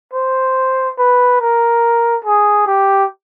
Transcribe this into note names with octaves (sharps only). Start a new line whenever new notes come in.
C5
B4
A#4
G#4
G4